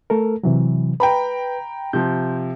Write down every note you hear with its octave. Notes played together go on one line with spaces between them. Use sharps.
A3 A4 A#4
C3 E3 F#3
B4 G5 A#5 B5
C3 F3 G6